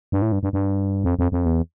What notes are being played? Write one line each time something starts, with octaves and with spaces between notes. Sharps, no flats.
G2
A2
G2
G2
G2
F2
F2
F2
E2